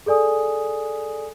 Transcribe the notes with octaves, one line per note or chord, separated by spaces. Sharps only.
G#4 A4 D5 G#5 D#6